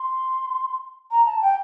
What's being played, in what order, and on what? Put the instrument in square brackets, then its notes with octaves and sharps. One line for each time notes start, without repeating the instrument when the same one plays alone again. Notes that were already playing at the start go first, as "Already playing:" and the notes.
Already playing: [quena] C6
A#5
A5
G5